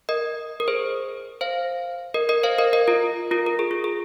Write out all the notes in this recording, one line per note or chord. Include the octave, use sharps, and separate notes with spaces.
A#4 D#5
A#4
G#4 C5
C5 F5
A#4 D#5
A#4 D#5
C5 F5
A#4 D#5
A#4 D#5
F4 A#4
F4 A#4
A#4
G#4
F4
G#4